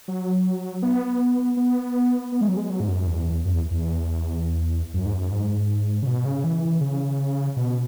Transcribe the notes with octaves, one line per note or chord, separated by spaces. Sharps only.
F#3
B3
B3
B3
G#3
F#3
G#3
F#3
G#2
F#2
E2
F#2
E2
E2
F#2
G#2
F#2
G#2
C#3
B2
C#3
E3
C#3
B2